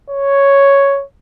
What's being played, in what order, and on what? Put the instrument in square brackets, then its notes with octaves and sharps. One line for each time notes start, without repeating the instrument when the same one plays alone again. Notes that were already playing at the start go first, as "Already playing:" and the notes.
[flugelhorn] C#5